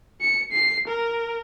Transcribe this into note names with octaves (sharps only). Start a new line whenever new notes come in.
C#7
C7
A#4